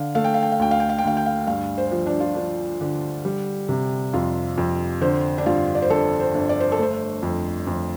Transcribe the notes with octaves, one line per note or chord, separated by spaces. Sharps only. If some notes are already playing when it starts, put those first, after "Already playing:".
Already playing: D3 F5
A3 F5
G5
F5
G5
F5
D2 G5
F5
G5
F5
G5
D2 F5
G5
F5
G2 F5
C5
F3
D4
F4
F3 D4
D3
G3
C3
F2 F4
F2
D3 C5
D4
G2 F4
D5
C5
G1 A4
C5
G1
D5
C5
A4
A3 C5
F2
F2